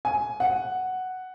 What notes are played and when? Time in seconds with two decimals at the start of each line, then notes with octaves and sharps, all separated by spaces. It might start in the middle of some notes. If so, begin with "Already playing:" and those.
0.05 G#5
0.40 F#5